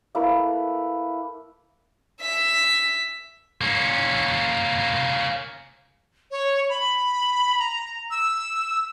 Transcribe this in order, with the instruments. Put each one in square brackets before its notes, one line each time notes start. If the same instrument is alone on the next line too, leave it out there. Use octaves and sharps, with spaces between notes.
[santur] A3 A#3 E4 B4
[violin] E5 B6
[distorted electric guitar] A#3 C#4
[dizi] C#5
B5
A#5
E6